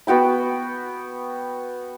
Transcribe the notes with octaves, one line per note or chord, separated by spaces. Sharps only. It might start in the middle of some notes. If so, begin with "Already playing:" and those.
B3 F#4 G5 B5